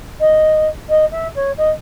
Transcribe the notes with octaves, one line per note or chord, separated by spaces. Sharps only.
D#5
D#5
E5
C#5
D#5